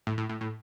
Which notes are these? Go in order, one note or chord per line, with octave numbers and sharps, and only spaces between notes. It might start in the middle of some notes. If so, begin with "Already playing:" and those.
A2
A2
A2
A2